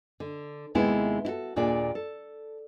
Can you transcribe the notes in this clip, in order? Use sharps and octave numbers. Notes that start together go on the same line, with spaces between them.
D3
D#2 C3 G#3 B3 E4
E4 F#4 A4
D#2 A#2 D4 G#4 D5
A4